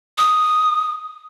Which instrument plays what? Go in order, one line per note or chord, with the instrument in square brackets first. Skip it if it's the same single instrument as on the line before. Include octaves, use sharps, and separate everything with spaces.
[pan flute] D#6